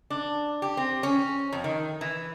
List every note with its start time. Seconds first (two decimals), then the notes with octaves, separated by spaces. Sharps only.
0.10 D4
0.62 G4
0.77 C4
1.03 C#4
1.52 F2
1.64 D#3
2.01 E3